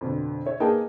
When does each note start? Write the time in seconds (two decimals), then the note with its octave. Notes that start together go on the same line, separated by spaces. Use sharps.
0.01 F2 B2 D3
0.46 C#5 E5
0.60 A#3 B3 D#4 G#4 G5 A5